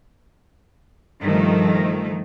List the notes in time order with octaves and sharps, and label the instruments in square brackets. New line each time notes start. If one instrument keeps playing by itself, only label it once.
[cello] G2 [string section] D#3 F3 A3